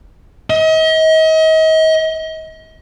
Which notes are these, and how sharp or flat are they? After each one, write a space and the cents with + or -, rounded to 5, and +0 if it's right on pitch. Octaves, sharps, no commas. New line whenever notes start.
D#5 +40